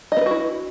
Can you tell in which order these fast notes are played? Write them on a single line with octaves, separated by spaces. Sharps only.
D#5 B3 B4 F#4 E4